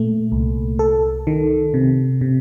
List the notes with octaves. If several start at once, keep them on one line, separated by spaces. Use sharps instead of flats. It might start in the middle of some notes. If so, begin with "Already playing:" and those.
Already playing: A#2 A3
C2
A4
D#3
C3
C3